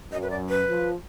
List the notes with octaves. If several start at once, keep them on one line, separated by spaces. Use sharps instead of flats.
F#2 D#5
B4
D5
B4
F3